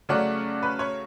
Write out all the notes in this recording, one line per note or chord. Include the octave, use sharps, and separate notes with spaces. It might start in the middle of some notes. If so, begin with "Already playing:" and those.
C#3 F#3 A3 C#4 D5 F#5
B4
C#5